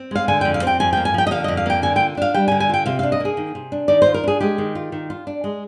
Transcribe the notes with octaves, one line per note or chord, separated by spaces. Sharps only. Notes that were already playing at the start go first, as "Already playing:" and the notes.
Already playing: C4
G#3 F5
D3 G#5
G5
F2
F5
C4 G5
F2 G#5
G5
A#3
G#5
F3 G5
D#5
D3 F5
F2 D#5
F5
A#3 G5
D3 G#5
G5
F4
D4 F5
G3 G5
G#5
D3
G#5
F4 G5
C3 F5
F5
D4
D#5
A#3 G#4
D#3
C3
D4
D#3 D5
F4 C5
A#4
D4 G#4
G#3 G4
D#3
F4
D#3
F4
D4
G#3